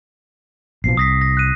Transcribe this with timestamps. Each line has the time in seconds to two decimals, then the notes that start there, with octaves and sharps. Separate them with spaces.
0.84 A#1 B2 F3 C7
0.97 C2 D#6 A#6 B6
1.22 A#6
1.37 F#6 D#7